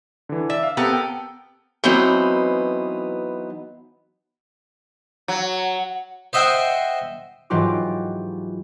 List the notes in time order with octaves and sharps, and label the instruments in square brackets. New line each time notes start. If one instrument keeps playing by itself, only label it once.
[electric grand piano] D3 E3
[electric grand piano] D5 [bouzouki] E5
[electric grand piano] F5
[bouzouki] B3 A4 A#4 [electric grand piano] C4 G4
[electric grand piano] G5
[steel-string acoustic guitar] E3 F#3 B3 C4 D#4
[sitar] F#3
[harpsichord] C5 D#5 E5 F#5 G5 C6
[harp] G#2 E3 F#3 F4 G4 D6